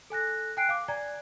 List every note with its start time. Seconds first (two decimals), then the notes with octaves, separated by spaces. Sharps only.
0.10 A4 G#5 F#6 A#6
0.57 G5 G#5 F#6 C7 D7
0.69 F5 D6
0.88 D5 G#5 A#5 G#6